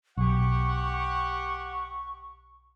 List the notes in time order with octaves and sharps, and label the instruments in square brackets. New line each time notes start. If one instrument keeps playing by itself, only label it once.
[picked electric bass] B1 [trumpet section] G4 F#5 [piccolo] C#6